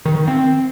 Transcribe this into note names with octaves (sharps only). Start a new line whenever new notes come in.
D#3
D#3
C4